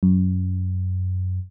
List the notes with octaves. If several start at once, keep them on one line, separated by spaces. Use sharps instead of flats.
F#2